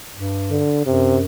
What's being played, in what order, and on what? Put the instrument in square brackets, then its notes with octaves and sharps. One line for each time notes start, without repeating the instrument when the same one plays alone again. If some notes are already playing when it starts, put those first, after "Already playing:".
[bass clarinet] G2
[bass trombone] D3
[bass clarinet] F#2 [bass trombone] C3